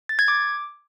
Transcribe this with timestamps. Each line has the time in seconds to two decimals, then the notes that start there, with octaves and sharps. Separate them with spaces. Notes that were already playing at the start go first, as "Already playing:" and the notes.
0.09 A6
0.19 G#6
0.28 D6